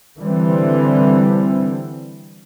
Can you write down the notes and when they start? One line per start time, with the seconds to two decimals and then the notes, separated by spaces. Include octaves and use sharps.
0.17 D3 E3 G3 C4